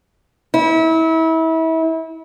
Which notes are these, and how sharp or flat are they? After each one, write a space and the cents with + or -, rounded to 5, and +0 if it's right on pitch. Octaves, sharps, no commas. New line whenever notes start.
E4 -30